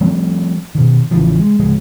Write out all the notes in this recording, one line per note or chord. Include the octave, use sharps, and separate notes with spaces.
F3 G3 A3 C4
B2 D#3
A1 C#3 E3 F3
G#3
D1 C#3 F3 G#3